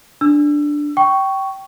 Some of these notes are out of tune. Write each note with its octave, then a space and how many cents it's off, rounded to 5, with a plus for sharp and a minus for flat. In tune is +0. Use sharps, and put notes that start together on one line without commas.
D4 +0 E6 +30
G5 -20 C#6 +5